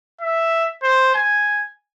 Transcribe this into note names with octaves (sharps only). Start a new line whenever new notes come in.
E5
C5
G#5